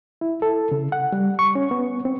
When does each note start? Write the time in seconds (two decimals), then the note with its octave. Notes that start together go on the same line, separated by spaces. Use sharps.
0.21 E4
0.42 A4
0.72 C#3
0.92 F#5
1.12 G3
1.39 C#6
1.55 C#4
1.71 B3
2.05 C4